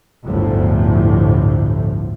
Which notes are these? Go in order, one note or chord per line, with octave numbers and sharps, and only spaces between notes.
G1 D2 A2 F3